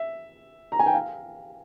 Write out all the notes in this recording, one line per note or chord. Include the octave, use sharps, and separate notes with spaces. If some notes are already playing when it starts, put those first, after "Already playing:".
Already playing: E5
A#5
G#5
G5
F5